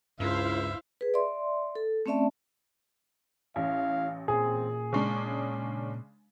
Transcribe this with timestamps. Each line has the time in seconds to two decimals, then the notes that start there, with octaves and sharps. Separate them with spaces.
0.20 C#2 G2 E4 C5 E5 F5
1.01 G#4 B4
1.14 D5 E5 C6
1.75 A4
2.06 A3 C4 C#4 D5 E5 A5
3.56 A1 C#4 E4 F5
4.28 A#2 C4 G#4
4.93 C#3 G#3 D4 C#6
5.25 C#4